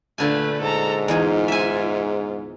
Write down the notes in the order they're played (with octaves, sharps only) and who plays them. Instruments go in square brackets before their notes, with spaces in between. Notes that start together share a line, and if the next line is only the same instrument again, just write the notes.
[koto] A#2 D3 G#5 [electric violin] A3 B4
[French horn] G#2 [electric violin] A4 A#5
[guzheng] E2 D#4 G#4 [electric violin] F4
[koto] E5 G#5